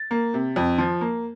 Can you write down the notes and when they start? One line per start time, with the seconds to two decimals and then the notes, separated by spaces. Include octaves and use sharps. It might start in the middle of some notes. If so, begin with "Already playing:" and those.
Already playing: A6
0.11 A#3
0.34 C3
0.56 F2
0.78 F3
1.01 A#3